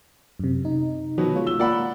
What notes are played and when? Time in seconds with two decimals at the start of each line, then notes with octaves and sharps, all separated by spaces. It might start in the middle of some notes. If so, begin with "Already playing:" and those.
0.39 F#2 C3
0.64 C3 D#4
1.18 B2 D#3 F3 F#3 B3
1.35 G#3 F4 C#5
1.47 E6 G7
1.60 A#3 F4 A#4 D5 F#5 B5